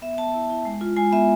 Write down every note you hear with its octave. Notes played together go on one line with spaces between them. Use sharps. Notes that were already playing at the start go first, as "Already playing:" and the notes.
B3 E5
B3 A5
E4
E4
G#3
F4
G#3 G#5
B3 E5